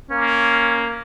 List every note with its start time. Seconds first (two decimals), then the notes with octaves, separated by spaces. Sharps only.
0.10 A#3 C#4